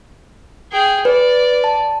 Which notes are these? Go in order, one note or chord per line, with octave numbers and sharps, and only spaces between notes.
G#4 G5
B4 D5
A5